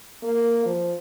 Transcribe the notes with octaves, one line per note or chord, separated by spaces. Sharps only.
A#3
F3